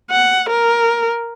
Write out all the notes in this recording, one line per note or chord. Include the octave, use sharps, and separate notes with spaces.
F#5
A#4